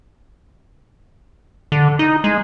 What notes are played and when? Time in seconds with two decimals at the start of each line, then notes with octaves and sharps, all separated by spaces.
1.72 D3
1.99 D#4
2.24 G#3